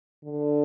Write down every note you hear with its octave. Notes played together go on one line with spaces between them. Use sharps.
D3